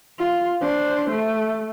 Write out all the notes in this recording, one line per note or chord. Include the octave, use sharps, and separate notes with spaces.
F4
D4 C5
A3